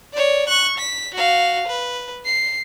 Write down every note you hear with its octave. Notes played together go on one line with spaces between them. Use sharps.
C#5 D5
C#6 F#6
B6
F#4 F5
B4
C7